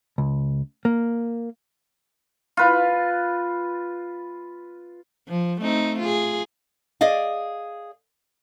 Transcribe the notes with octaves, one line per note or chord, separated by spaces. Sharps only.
C#2
A#3
F4 B4
F3
A3 C4 D#4
F4 G#4
G#4 D5 D#5 F5